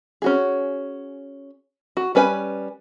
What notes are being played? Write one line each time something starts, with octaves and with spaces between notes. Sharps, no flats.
C#4 F#4 G#4
F#4
G3 C#4 B4 E5 G#5